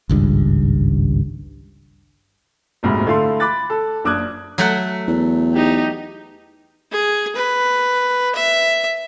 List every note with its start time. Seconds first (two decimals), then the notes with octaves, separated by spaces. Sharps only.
0.09 G#1 C#2 G2
2.83 F#1 D2 G#2 C3 F#4 B5
3.06 D3 A3 E4 F5 C6
3.40 B5 D6 F#6 A6
3.70 A4
4.04 F#1 D4 D6 D#6 F#6 G#6
4.58 F#3 A3 F#5
5.08 E2
5.54 D#4 G4
6.92 G#4
7.36 B4
8.36 E5